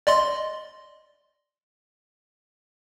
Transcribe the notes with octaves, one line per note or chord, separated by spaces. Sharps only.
D5 D#5 C6